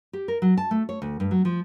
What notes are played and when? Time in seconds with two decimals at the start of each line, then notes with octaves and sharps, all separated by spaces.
0.13 G4
0.28 A#4
0.42 F#3
0.58 A5
0.71 A3
0.89 C#5
1.02 D2
1.20 G2
1.31 F#3
1.45 F3